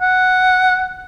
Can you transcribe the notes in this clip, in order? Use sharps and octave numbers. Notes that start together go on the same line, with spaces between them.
F#5